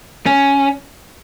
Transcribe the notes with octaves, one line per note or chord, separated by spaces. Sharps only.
C#4